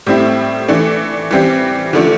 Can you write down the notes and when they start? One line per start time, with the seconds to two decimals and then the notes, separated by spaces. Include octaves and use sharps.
0.07 A2 G3 C4 E4
0.68 E3 A3 D4
1.31 E3 G3 C4
1.93 D3 F3 A3 D4